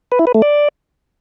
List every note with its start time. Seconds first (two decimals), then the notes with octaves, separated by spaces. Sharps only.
0.12 B4
0.19 E4
0.27 B4
0.35 A3
0.42 D5